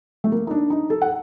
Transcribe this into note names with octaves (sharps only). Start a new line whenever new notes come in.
A3
A#3
D#4
D4
D#4
A4
F#5